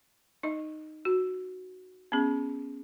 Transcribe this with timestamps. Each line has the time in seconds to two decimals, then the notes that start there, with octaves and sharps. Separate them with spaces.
0.43 D#4 D#5
1.05 F#4
2.12 B3 C#4 G#4